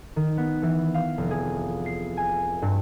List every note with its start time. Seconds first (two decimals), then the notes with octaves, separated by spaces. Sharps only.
0.16 D#3
0.37 B3
0.62 E3
0.94 F5
1.18 F1
1.31 G#4
1.86 C7
2.17 G#5
2.62 G2